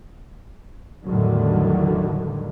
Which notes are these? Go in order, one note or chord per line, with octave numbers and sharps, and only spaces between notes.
E2 A2 D3 D#3 F#3 G3